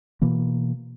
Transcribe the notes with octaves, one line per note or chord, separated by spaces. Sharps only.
B2 E3 A#3